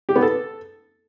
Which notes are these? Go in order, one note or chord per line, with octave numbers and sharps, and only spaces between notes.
G4
B3
A4